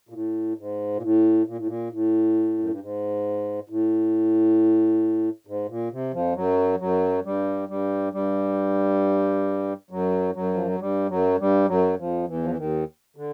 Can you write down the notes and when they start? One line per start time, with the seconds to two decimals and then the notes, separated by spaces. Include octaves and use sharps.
0.09 A#2
0.13 A2
0.58 G#2
0.97 A#2
1.03 A2
1.47 A#2
1.58 A2
1.66 A#2
1.92 A2
2.59 F#2
2.69 G2
2.80 G#2
3.69 A2
5.47 G#2
5.69 A#2
5.92 C3
6.13 F2 F3
6.35 F#2 F#3
6.80 F#2 F#3
7.25 G2 G3
7.69 G2 G3
8.13 G2 G3
9.91 F#2 F#3
10.35 F#2 F#3
10.54 F3
10.67 F#3
10.80 G2 G3
11.10 F#2 F#3
11.39 G2 G3
11.68 F#2 F#3
11.98 F2 F3
12.28 E2 E3
12.43 F3
12.50 E3
12.57 D#2 D#3
13.16 D3